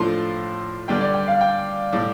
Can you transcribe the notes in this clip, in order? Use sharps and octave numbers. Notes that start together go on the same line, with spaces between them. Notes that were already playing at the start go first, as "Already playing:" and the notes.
Already playing: A2 F3 A3 D4 F4 C6
G2 D3 G3 G5
D5
G5
F5
G5
A2 G3